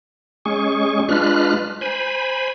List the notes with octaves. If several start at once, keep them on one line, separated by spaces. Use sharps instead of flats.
G#3 C#4 G#4 C#6
G#3 D4 F4 B4 F6 F#6
C5 G#5 B5